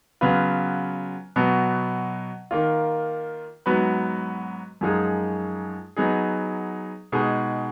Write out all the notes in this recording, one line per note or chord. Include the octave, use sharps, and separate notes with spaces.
C#3 F#3 B3 F4 B4
B2 F#3 B3
D#3 A#3 F4
G#2 F#3 B3 F#4 B4
F#2 F3 G#3 D#4 G#4
F#3 B3 D#4 G#4
B2 G#3 D#4 G#4